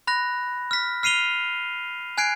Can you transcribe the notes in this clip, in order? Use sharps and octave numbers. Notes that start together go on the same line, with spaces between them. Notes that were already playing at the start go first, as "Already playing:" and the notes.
B5 F#6 A#6
F6 B6
F6 C7 D#7 F7 G7
G#5 F#6 G#6 C7 D7